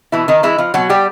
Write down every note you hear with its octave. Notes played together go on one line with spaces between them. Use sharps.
B2 E3 E4
D#3 D#4
E3 G#3 E4
F3 F4
B2 F#3 F#4
G3 G4